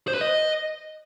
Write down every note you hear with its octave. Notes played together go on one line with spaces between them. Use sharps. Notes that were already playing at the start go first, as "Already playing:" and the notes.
C5
B4
D#5